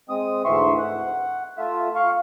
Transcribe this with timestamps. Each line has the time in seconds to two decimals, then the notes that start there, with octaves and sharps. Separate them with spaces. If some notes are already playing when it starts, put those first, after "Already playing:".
0.09 G#3 C4 D#6
0.45 D2 G#2 E3 E5 C6 C#6
0.78 F#5
1.58 A3 F4 E5
1.95 F5 C#6